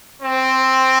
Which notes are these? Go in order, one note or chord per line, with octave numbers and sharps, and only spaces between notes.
C4